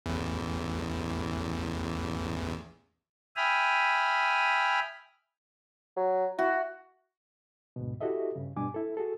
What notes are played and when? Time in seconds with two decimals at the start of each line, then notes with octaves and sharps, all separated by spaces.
0.06 A1 E2
3.36 E5 G5 G#5 B5 D#6 F6
5.97 F#3
6.39 E4 F#4
7.76 D2 G#2 B2
8.01 E4 F#4 G4 A4 D#5 E5
8.36 G2 C#3
8.57 G2 B2 G3 D4 G#5 D6
8.74 E4 A4
8.97 F#4 G#4 A4